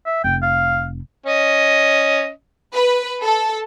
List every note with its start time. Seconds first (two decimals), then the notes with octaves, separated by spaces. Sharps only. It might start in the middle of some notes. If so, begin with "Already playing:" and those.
0.06 E5
0.24 F1 G5
0.43 F5
1.27 C#4 D#5
2.75 B4
3.22 A4